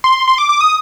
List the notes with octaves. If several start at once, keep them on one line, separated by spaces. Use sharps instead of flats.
C6
C6
D6
D6
D#6